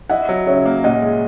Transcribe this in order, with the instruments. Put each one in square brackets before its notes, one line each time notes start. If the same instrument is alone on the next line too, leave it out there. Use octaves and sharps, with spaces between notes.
[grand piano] E4 [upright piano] D#5 F#5
[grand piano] F#3
[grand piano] C#3 [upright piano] C#5 E5
[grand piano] A#3
[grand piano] A#2 [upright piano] D#5 F#5
[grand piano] G#3